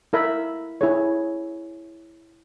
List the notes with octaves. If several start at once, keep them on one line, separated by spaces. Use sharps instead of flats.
E4 A#4 E5 B5
E4 G#4 C#5